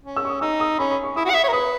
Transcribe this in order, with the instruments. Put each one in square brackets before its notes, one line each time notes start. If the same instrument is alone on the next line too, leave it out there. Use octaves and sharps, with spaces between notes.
[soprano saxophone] C#4
[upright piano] E6
C#6
D#6
[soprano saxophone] D#4 [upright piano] E6
[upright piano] D#6
[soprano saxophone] C#4 [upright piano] B5
[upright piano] B5
C#6
[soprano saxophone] E4 [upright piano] D#6
[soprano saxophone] F#4
F#5
[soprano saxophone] E5 [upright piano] D#6
[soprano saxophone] C#5
A#4
[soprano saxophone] B4 [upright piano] D#6